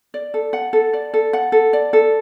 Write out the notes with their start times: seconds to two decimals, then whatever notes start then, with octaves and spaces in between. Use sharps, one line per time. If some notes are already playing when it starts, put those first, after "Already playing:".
0.14 D5
0.34 A4
0.53 F#5
0.73 A4
0.93 D5
1.14 A4
1.33 F#5
1.52 A4
1.73 D5
1.93 A4